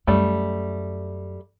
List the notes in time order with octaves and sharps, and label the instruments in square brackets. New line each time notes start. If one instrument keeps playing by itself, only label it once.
[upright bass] F#2 [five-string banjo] G3 A3